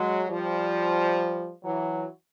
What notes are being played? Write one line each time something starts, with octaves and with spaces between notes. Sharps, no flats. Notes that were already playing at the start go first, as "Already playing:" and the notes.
Already playing: F#3 G#3
F3 G3
E3 F#3